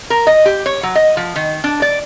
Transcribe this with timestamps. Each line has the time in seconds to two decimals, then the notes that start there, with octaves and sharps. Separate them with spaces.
0.10 A#4
0.27 D#5
0.45 G4
0.66 C#5
0.83 F#3
0.95 D#5
1.17 F3
1.36 D#3
1.64 D4
1.82 D5